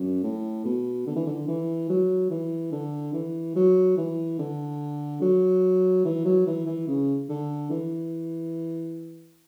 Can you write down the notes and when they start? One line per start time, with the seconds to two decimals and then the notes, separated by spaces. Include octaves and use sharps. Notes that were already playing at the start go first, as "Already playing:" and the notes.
Already playing: F#2
0.24 A2
0.65 B2
1.07 D3
1.16 E3
1.27 D3
1.48 E3
1.89 F#3
2.30 E3
2.72 D3
3.13 E3
3.56 F#3
3.97 E3
4.39 D3
5.21 F#3
6.05 E3
6.25 F#3
6.47 E3
6.66 E3
6.88 C#3
7.29 D3
7.70 E3